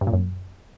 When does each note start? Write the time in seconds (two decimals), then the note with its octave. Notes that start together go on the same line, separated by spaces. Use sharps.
0.01 G2
0.07 A#2
0.13 F#2